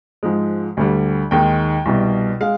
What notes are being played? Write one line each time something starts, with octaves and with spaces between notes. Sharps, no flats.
G#2 F3 G#3
D2 D3 G3
D#2 D#3 G#3 G5
C2 B2 G3
G#3 F5